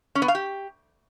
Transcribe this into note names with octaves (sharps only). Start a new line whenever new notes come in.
C#4
B3
F5
G4